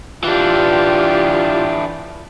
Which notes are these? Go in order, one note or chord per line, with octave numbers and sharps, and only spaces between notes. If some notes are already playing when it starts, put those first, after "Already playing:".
E3 D4 F4 G4